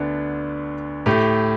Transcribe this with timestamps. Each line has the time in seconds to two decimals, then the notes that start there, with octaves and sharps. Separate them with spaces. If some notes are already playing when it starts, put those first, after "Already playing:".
Already playing: D2 D3 B3 D4
1.06 A2 A3 G4